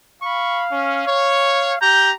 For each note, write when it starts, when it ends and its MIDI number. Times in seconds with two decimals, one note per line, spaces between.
0.23 1.77 77
0.23 0.64 83
0.23 0.64 85
0.70 1.01 61
1.06 1.73 73
1.81 2.12 67
1.81 2.12 82
1.81 2.09 91